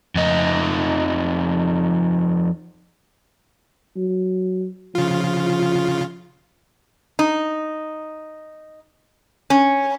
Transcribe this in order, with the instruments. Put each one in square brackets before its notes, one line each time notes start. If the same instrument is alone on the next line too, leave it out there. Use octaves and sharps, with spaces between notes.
[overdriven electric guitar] F2 D#4
[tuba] F#3
[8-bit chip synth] C#3 F4 [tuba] F3
[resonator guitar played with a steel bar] D#4
C#4